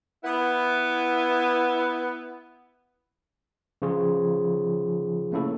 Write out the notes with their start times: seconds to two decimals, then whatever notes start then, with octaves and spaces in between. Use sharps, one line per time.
0.23 B3 E4
3.82 C#3 F3 F4 G#4
5.32 A3 A#3 C#4 E4 A4